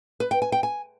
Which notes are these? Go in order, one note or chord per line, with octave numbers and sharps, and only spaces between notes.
B4
G5
G#5
G5
G#5